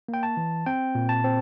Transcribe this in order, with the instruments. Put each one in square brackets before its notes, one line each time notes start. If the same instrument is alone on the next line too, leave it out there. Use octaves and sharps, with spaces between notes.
[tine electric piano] A#3
G5
A5
E3
C4 G5
A#2
A5
C4